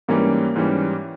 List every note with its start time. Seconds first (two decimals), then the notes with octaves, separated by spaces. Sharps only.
0.08 G#2 E3 G3 A#3 C#4
0.55 G#2 E3 G3 C#4